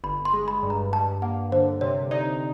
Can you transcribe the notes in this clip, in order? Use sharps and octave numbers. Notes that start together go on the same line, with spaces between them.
G1 B5
C6
G#3
B5
G2
A#5
G2 A5
A#3 F#5
D3 C5
C3 C#5
D#4 D5